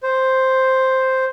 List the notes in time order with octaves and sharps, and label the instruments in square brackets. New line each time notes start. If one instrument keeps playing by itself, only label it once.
[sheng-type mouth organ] C5